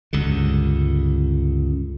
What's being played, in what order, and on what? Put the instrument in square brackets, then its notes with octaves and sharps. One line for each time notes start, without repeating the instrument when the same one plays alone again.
[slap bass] C#2 G2 D3